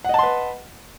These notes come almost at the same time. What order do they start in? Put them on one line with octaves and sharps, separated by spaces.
F#5 D#5 A5 C6 B4